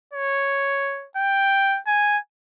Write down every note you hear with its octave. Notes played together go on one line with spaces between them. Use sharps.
C#5
G5
G#5